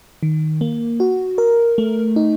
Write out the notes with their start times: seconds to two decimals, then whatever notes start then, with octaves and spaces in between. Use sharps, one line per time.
0.23 D#3
0.61 A#3
1.00 F#4
1.38 A#4
1.78 A3
2.16 D#4